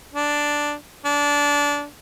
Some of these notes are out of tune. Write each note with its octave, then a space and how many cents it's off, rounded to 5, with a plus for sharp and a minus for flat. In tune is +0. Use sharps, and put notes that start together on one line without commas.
D4 +0
D4 -20